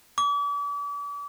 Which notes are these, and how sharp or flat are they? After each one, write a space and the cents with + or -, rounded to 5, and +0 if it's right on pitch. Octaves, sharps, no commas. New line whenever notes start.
D6 -40